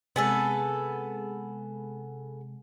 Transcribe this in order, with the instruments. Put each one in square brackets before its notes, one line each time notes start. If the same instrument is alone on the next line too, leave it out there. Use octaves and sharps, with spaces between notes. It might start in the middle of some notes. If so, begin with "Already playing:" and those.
[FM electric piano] C3 G#3 [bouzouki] B3 G#4 A4